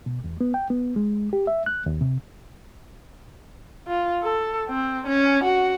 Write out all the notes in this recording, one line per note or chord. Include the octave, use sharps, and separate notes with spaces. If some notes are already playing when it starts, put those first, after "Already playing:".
B2
E2
B3
G5
B3
G#3
G4
E5
F#6
D#2
C3
F4
A4
C4
C#4
F#4